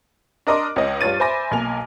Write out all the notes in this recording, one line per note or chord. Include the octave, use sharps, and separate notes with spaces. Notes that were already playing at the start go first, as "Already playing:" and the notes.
D4 A#4 D#5 C6 D6
C#2 C#4 D#5
G2 F4 C#5 A6 D#7
C5 E5 G#5 B5 D6 A#6
B1 A#3 G#5 F7